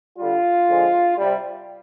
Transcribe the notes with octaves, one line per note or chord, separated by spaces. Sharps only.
D3 G3 F4
D3 F3 G#3
C3 G3